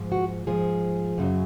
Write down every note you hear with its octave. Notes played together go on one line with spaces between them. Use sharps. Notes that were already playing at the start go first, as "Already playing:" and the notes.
Already playing: G#2 F3
F#4
G#2 F3 G#4
F#2 C#3 F#3